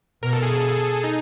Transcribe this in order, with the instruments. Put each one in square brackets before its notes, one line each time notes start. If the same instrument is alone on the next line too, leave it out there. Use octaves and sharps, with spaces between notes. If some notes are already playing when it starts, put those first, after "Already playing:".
[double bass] B2 [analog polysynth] A#4
[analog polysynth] A4
G#4
G#4
D#4